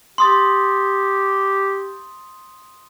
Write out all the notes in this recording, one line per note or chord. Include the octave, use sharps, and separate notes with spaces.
G4 C6 D#6 A6